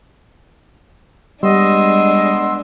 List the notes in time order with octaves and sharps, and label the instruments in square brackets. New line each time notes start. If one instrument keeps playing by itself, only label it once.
[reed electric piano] G3 [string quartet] G#3 D4 [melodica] B3 C6 E6 [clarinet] D#5